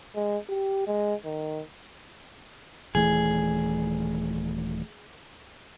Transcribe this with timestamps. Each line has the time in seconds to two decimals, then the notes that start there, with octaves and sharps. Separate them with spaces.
0.15 G#3
0.49 G4
0.87 G#3
1.25 D#3
2.95 D#1 E3 A3 G#4